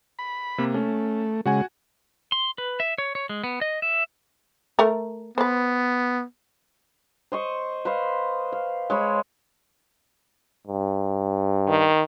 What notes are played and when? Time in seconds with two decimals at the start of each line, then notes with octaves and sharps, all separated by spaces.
0.19 B5
0.58 C3 A#3
0.74 A3 C#4
1.46 C#3 G#3 F#4 F#5 G#5
2.32 C6
2.58 B4
2.80 E5
2.98 C#5
3.15 C#5
3.29 G#3
3.44 B3
3.61 D#5
3.82 E5
4.79 A3 A#4
5.38 B3 B4 C5
7.32 C5 D#5 C#6
7.85 B4 C5 D#5 F5
8.53 F5
8.90 G#3 C#5 B5
10.67 G2
11.68 D#3